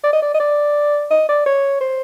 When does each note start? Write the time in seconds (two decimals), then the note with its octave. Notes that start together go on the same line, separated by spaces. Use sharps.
0.04 D5
0.13 D#5
0.22 D5
0.34 D#5
0.40 D5
1.10 D#5
1.29 D5
1.46 C#5
1.81 C5